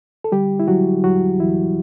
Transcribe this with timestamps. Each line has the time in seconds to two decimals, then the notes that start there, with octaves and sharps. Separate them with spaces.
0.24 A4
0.32 D3 G3 G4
0.60 E4
0.68 D3 F#3 F#4
1.04 E2 F#3 F#4
1.40 E2 E3 E4